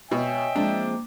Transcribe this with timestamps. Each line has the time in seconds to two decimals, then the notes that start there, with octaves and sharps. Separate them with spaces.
0.11 B2 C#5 D#5 E5 G5 G#5
0.56 F3 G#3 A#3 C4 D4 D6